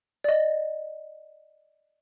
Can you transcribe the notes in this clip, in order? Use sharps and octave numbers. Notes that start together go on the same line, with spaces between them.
D5 D#5